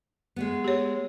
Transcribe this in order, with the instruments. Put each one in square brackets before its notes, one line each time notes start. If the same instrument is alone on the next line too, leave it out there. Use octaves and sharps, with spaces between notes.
[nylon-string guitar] G#3 A3 B3
[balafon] G4 C#5